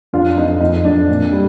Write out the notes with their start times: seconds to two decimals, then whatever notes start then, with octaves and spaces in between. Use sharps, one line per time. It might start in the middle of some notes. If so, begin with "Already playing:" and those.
0.13 F2 D4 F4
0.37 F2 D#4
0.61 F2 D#4
0.85 F2 D4
1.09 A#2
1.33 G3